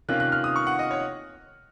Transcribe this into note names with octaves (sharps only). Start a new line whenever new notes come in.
C3 D#3 A#3 C#4 F4 F#6
F#6
F6
D#6
C#6
F#5
D#5
C#5